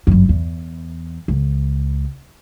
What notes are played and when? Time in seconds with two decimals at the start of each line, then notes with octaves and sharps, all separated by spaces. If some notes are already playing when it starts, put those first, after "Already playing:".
0.07 G1 F#2
0.29 E2
1.28 C#2